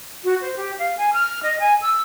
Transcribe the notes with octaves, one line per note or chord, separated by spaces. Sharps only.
F#4
C5
G4
F5
G#5
F6
D#5
G#5
E6